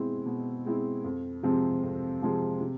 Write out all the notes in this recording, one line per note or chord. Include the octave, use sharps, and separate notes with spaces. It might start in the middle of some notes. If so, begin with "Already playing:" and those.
Already playing: B2 G#3 C4 E4
B2
G#3 C4 E4
F2
C3 F3 G#3 C4
F2
C3 F3 G#3 C4
C3